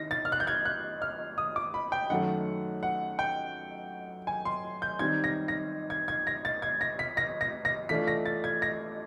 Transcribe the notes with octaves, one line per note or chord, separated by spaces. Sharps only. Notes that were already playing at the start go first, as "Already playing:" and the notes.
Already playing: D#3 E4 A#6
A6
F6
F#6
G6
G#6
F#6
F6
D#6
D6
B5
G5
F#2 D#3 F#3 A3 F#5
F#5
G5
G#5
C6
G6
D#3 G3 C4 D#4 G#6
A#6
A#6
G#6
G#6
A#6
A6
G#6
A#6
B6
A#6
A#6
A#6
E3 A3 D4 F4 B6
A#6
A6
G#6
A#6